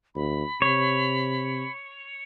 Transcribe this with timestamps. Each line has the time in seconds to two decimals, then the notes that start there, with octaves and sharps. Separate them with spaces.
0.15 D2 B5
0.62 C3 C#5